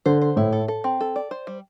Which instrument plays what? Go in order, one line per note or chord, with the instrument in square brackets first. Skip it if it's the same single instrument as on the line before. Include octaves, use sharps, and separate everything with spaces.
[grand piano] D3 [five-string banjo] C5
[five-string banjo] C5
[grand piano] A2 [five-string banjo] E4
[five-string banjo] A4
A4
C4
A4
D5
C5
G3